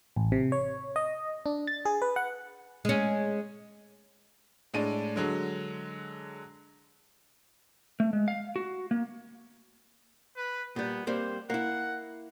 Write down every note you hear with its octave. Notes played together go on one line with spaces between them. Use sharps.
A1
C3
C#5
D#5
D4
A6
G#4
B4
F#5
G#3 C#4
A2 G#3 D4 D#7
D3 F#3 G#3
A3
G#3
F5
F#4
A#3
B4
A#2 G3 B3
G3 A#3 C4 C5
A#3 E4 F#5